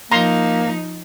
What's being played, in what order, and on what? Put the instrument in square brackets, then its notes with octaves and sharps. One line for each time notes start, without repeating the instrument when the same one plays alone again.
[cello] F3 D#4 [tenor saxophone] A#3 [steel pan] A#5 C6